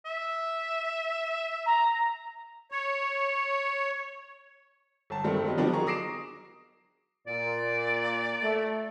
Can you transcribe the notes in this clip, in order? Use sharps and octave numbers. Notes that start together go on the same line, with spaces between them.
E5
A#5
C#5
G1 A5
G2 D#3 G3 A3 C4
F#3 G3 B3 D#4
F3 G3 B3 D4 D#4 F#4
F#3 G#4 A#4 A#5 C#6
D6 D#6 A#6 C7 D7 E7
A#2 D5
A3